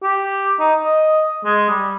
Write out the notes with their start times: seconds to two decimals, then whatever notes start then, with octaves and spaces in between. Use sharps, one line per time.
0.03 G4
0.60 D#4
0.83 D#5
1.45 G#3
1.70 G3